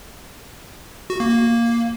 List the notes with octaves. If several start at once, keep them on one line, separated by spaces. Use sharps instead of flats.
F#4
A#3
A#3